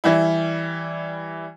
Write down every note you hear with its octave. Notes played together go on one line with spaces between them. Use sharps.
E3 G3 E4